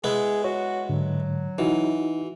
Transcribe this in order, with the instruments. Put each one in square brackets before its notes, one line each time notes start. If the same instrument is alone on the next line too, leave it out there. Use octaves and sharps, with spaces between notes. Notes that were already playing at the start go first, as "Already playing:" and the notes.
[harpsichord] G#3 B3 E4 [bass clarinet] G#4
[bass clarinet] F#4 [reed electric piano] C#5
[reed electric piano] G#2 D3 [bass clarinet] F#3
[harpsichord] E3 [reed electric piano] D#4 E4 F#4